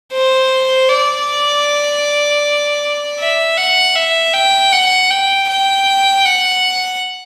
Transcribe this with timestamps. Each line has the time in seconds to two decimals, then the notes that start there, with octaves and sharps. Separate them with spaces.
0.13 C5
0.89 D5
3.19 E5
3.57 F#5
3.95 E5
4.33 G5
4.72 F#5
5.10 G5
5.48 G5
6.25 F#5